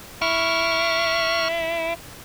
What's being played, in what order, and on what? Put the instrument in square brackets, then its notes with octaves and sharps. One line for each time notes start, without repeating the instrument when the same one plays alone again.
[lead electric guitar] E4 [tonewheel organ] C#6 F6